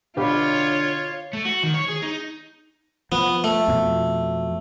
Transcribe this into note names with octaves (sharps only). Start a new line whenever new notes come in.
B2 D3 F4 G4 C#5 F5
A3
F#4
D#3
C#5
G#4
D#4
F3 B3
A3
F2 B2 F3